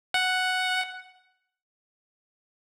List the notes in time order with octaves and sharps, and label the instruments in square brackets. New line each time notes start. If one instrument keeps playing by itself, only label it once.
[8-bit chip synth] F#5